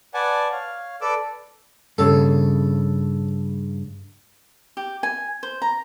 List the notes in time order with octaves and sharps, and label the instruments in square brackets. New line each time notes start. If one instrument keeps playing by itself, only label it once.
[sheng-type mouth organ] B4 D5 F#5 G#5 A5
C#5 F5
A4 B4 D5 D6 E6
[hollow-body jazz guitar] G2 C#3 [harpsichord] A4
[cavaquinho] G4
G#5
C5
A#5